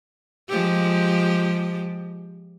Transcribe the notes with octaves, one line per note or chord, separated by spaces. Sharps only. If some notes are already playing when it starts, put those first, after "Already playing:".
F3 G#3 G4